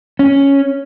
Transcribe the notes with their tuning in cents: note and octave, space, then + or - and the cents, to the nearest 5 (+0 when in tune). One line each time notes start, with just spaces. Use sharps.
C#4 +0